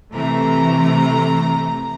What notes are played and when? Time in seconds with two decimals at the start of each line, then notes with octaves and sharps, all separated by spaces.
0.15 C3 E3 A3 A#5